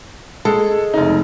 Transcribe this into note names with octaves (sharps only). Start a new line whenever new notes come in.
G#3 A4
F1 D#4